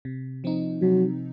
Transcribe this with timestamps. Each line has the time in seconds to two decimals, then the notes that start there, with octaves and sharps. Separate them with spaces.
0.05 C3
0.44 F3 C4 D#4
0.82 C3 F#3